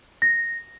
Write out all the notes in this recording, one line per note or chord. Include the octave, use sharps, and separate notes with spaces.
A#6